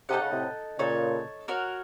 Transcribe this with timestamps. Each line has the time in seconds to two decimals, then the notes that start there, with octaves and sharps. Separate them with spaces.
0.09 C3 D#4 A4 D#5 F#5
0.21 C#3
0.32 A2 C3
0.78 A#2 C#3 D#4 A4 C#5
1.48 F#4 A#4 C#5